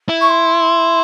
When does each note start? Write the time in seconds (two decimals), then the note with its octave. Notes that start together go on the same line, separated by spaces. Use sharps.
0.09 E4
0.21 C#6
0.29 C6